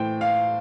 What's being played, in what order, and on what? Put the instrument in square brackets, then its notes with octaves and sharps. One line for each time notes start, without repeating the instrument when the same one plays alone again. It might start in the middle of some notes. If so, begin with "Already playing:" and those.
Already playing: [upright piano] A2 E3 C5 G5
F5